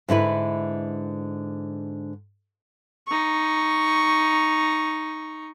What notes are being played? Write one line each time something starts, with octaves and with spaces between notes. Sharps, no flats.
G#2 D3 E4 B4
D#4 C#6